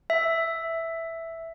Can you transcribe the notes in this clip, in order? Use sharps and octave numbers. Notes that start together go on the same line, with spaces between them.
E5